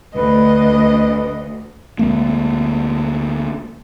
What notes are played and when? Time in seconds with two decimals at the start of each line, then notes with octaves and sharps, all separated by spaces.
0.15 D2 B4 D#5
1.99 D2 G#3 A#3